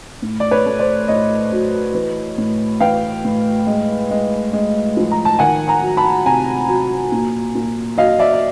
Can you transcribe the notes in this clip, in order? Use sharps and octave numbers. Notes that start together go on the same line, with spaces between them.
A2
D5
B4 C#5
A3
C5 D5
A2 C#5 D#5
F#3
E3
A2
E3 F5 G5
A2
G#3
G#3
G#3
F3
A#5
A5
D#3 F#5 G#5
G#5 A#5
F#3
A5 B5
C3 G#5 A#5
F#3
A#2
A#2
F#3 D#5 F5
D5 E5
D5